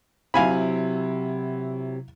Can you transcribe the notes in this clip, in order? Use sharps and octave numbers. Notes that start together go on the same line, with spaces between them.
C3 F#3 E4 F5 G#5 B5